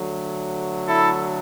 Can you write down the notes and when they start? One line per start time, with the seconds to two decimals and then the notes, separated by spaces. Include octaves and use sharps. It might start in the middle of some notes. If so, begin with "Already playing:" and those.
Already playing: D3 F#3 A3
0.87 E4 A4